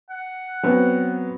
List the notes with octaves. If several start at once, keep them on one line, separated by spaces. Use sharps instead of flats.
F#5
F#3 B3 C4